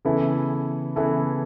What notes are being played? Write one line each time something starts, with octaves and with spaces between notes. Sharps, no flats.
C#3 E3 B3 E4 A4
C#3 E3 B3 E4 A4